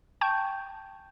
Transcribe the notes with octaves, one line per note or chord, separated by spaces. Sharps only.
G5 A5 C#6 G6